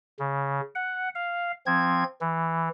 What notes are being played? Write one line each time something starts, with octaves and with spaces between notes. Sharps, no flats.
C#3
F#5
F5
F3 C4 G#6
E3